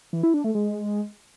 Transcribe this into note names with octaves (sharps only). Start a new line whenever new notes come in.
E3
E4
D4
A3
G#3